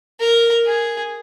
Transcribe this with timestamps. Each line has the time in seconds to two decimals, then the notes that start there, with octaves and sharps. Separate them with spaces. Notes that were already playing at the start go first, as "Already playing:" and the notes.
0.20 A#4
0.66 G#4